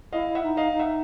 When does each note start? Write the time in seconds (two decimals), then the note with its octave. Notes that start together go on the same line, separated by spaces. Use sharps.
0.13 E4 D#5 F5
0.35 E5 F#5
0.43 D#4
0.57 D#5 F5
0.72 D#4
0.79 E5 F#5